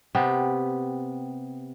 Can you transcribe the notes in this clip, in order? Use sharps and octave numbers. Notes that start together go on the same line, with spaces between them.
C3 B3 G4